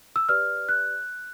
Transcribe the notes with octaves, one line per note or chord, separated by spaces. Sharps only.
E6
G4 B4 D5 F6
F#6